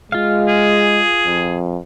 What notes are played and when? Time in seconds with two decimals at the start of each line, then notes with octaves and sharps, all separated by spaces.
0.12 G#3 F4 F5
0.48 G#4
1.26 F2